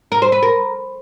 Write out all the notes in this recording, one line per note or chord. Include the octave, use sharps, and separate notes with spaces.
A#4
C5
B4
A#4